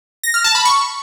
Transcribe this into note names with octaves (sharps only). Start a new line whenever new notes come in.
A#6
F6
A5
B5
C#6